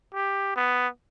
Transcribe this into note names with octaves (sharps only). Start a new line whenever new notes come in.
G4
B3